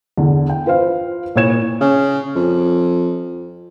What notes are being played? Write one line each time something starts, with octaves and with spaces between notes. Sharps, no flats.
E2 D3
G5
F4 B4 C5 F5
A#2 E4 C#5 G#6 E7
C#3
F2